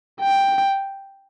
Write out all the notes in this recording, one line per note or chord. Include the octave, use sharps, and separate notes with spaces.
G5